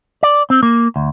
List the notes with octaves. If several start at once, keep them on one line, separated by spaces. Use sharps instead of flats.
D5
C4
A#3
D2